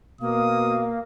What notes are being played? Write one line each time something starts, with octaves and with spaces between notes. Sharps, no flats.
B2 A#3 F5 D#6